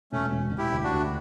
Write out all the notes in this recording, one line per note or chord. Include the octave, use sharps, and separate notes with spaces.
E1 A3 C#4
E1
E1
E4 G4
D2
D4 F#4
D2